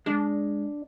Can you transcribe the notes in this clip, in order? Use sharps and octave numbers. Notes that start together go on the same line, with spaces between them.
G#3 D4